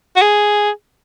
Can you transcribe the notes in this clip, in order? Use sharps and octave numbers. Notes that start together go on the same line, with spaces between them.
F#4
G#4